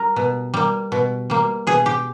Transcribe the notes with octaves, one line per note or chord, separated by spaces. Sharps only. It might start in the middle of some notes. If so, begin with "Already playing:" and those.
Already playing: G3 A#4
B2
G3 A#3
B2
G3 A#3
B2 G#4
G4